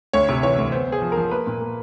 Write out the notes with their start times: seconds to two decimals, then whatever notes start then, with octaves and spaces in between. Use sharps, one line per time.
0.13 D2 C#5
0.29 C3
0.43 E3 C#5
0.58 D2
0.72 B3 C5
0.88 B3 G#4
1.02 F3
1.12 A#4
1.17 F3
1.31 A#3 B4
1.47 A#2
1.61 A#3